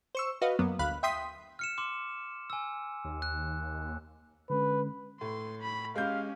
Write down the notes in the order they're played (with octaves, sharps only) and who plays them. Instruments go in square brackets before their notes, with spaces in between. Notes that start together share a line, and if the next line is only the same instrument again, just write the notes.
[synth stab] C5 C#6 E6
F#4 B4 D#5 F5
F#2 F#3 A#3 B3
G1 D2 F5 B5 F#6
E5 G5 C6 D#6 B6
[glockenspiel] F6 C#7 E7
C6 D6
G#5 E6
[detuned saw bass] D#2
[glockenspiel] F#6
[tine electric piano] D3 G#3 C#4 [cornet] B4
[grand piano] A2 [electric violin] C6
[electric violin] B5
[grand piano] G#3 G6 [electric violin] C#4 G4 [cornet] F5